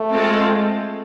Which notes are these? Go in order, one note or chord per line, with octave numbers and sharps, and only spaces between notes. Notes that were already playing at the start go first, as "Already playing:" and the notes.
Already playing: A3
G#3 C4 F4 A4